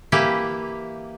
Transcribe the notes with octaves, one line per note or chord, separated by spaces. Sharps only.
E3 A#3 E4 G4